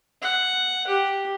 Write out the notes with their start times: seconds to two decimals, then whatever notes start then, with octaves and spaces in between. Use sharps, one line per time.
0.22 F#5
0.87 G4